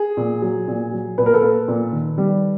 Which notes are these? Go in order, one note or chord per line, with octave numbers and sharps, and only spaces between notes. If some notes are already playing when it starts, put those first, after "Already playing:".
Already playing: G#4
A#2
F#3
A#2
F#3
A#2 B4
A#4
A4 B4
A#3
A#2
D#3
G3